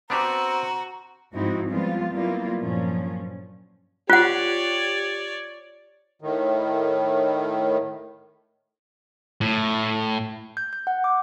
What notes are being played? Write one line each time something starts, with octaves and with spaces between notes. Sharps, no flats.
B3 C4 D4 F#4 G4 A#5
G#2 F3 C4 D#4 E4 F#4
F3 G3 G#3 B3 C4 F4
F#3 G3 A#3 B3 E4 F4
G2 A#2 F3 F#3 C#4
F4 G4 C#5 D5 F#5 F#6
A2 D#3
A2
G6
G6
F#5
D6